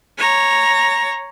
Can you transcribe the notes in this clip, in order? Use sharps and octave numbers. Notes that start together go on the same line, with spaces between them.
C#5 A#5